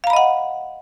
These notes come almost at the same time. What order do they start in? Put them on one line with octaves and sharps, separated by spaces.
F5 A#5 B5 D#5 F#5